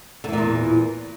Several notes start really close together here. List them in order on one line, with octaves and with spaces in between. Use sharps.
D3 E3 A#2 E2